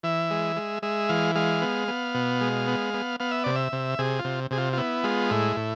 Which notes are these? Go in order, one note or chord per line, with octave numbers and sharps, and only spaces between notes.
E3 E5
G#3
G#3
G#3 E5
E3 F5
G#3 F5
B3
B3
B2
G#3
B3
B3
B3 F5
E5
C3 D5
E5
C3
C3 G#4
F4
C3
C3 G#4
F4
F4
B3 E4
G#3 F4
A2 E4
A2